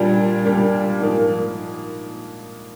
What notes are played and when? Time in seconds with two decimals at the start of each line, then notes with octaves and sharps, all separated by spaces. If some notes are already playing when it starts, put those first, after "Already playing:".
Already playing: A#2 G3 A#3 D4
0.45 A#2 G3 A#3 D4
1.00 G#2 F3 A#3